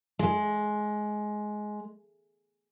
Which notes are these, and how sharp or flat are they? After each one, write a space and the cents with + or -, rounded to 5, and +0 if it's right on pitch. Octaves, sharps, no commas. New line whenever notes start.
G#3 +15